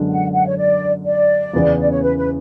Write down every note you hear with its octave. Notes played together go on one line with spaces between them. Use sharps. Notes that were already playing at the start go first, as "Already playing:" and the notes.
Already playing: F#2 D3 G#3 B3 D4
F#5
F#5
C#5
D5
D5
E2 C#3 E3 B3
D5
C#5
B4
B4